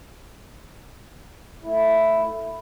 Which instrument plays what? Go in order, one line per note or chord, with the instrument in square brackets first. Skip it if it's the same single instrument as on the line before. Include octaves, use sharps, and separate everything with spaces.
[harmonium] A3 E4